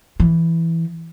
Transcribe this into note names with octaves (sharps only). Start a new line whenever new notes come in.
E3